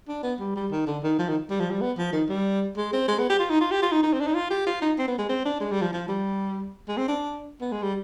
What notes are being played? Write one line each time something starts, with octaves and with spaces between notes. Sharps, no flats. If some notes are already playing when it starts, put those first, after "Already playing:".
D4
B3
G3
G3
D#3
D3
D#3
F3
D#3
G3
F3
G3
B3
F3
D#3
G3
G#3
C4
G#3
B3
G4
F4
D#4
F4
G4
F4
D#4
D#4
C4
D4
D#4
F4
G4
F4
D#4
C4
B3
G#3
C4
D4
G#3
G3
F3
F3
G3
G#3
C4
D4
B3
G#3
G3